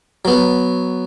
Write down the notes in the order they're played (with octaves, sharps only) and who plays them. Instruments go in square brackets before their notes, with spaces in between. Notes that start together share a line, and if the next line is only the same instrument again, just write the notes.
[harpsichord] F#3 B3